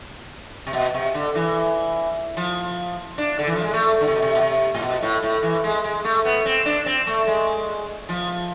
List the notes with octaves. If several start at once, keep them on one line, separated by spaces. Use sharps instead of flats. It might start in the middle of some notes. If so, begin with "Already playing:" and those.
C3
B2
C3
D3
E3
F3
D4
D3
E3
F3
G#3
A3
D3
C3
B2
C3
B2
C3
A2
B2
A2
A2
E3
G#3
G#3
A3
B3
C4
D4
C4
A3
G#3
F3